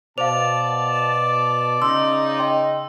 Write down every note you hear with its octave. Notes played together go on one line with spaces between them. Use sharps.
B2 C5 D5 F5 A5 F7
C#3 D#4 C6 E6
D#5 G5 C6